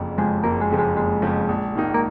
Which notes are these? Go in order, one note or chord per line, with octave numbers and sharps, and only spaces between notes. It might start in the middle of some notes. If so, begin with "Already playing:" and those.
Already playing: F#1 F2 C#3 F3
F2 C#3 F3 G#3
F#1 A#3
G#3
F2 C#3 F3
G#3
F#1 G#3
F2 C#3 F3
A#1
G#2 D#3 A#3 D#4
A#3